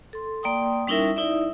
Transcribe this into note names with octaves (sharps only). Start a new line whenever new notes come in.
A4 C6
A#3 D5 G5 C6 D#6
G3 C#4 D#4 E4 A#4 E5
D#4 E4 D5 E5